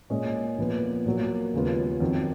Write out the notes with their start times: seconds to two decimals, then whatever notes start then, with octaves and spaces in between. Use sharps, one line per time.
0.10 A#2 G#3 C#4 G#4 D#5
0.58 A#2 F3 B3 F4
1.06 A#2 F#3 A#3
1.54 D#2 C#3 G#3 B3 F4
2.00 F2 D#3 F#3